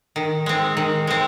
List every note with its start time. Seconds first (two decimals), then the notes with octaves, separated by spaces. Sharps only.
0.16 D#3
0.46 G#3 C4
0.77 D#3
1.07 G#3 C4